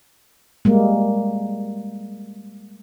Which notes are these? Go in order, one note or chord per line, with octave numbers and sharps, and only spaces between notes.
G3 G#3 A#3